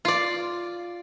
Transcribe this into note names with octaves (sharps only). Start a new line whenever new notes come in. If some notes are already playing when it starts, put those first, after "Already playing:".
F4 D5